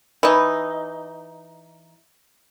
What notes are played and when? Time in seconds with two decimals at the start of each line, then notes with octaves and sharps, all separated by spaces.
0.23 E3 D#4